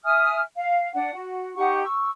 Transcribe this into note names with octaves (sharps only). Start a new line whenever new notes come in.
E5 G#5 D#6 F6
F5
D4 F#5
F#4
D#4 G4 F#5 C#6
C#6 E6